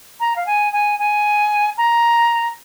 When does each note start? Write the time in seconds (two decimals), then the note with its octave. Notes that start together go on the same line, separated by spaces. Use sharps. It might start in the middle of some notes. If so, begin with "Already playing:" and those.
0.20 A#5
0.36 F5
0.46 G#5
0.73 G#5
0.99 G#5
1.77 A#5